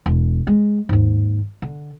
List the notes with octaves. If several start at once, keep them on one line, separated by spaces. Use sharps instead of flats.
E1
G#3
D#2 G#2
D3